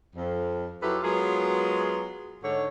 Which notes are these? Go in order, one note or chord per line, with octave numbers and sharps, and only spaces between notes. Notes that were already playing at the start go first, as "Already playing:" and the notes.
F2
F#3 E4 F4 G4 A4 B4
F#3 G#3 B3 F4 G#4 A#4
G#2 D3 C#5